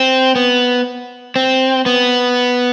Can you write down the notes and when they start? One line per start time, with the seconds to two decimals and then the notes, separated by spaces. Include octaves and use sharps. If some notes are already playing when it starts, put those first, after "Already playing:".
Already playing: C4
0.36 B3
1.36 C4
1.86 B3